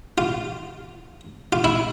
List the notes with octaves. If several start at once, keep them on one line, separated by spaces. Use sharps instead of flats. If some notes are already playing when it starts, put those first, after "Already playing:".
F4
F4
E4